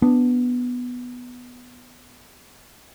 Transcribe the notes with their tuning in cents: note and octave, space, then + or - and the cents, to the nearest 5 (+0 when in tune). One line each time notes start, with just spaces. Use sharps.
B3 +0 D4 +0